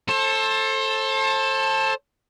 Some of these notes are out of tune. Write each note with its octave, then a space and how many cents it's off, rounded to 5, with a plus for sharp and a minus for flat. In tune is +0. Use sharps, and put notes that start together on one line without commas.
A4 +0 C5 +35